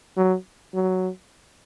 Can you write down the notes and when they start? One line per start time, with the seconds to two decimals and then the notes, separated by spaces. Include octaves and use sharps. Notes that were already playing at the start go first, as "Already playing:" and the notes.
0.17 F#3
0.74 F#3